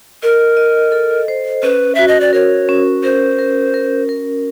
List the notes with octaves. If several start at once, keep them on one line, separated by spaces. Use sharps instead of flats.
A#4 D#5
D#5
A4
C5
C#4 B4
F#4 E5
D#5
D5
A#4 C#5
C#4
A#4 C5
A#4
A#4
A#4